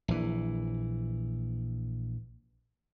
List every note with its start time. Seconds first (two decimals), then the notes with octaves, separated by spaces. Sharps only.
0.08 A#1 E3